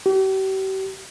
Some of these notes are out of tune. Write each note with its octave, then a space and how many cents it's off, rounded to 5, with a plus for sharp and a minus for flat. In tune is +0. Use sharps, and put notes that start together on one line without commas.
G4 -40